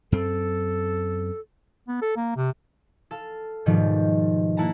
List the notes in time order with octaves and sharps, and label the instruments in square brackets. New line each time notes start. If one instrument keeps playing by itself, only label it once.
[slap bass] F#2 C4 [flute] A4
[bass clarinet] B3
A4
A#3
C3
[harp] A4 F5
G#2 B2 D#3 F3 G3
A#3 E4 F#5 A5 A#5